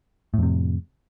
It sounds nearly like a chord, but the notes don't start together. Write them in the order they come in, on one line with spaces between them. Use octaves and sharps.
A2 F2 C3